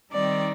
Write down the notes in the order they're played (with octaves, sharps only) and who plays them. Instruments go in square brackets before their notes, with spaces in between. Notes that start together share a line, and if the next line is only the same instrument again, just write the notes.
[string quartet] D#3 G3 C4 D#4 D5